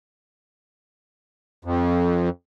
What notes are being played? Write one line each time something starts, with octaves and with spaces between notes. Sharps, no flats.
F2